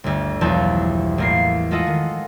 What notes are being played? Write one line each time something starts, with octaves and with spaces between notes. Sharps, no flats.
G1 D2
B1 E2 F3 A5 G6
A1 A#3 C7
G#3 F4 A4 D#5 F#5
D#3